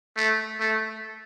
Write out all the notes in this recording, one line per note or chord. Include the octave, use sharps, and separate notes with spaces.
A3
A3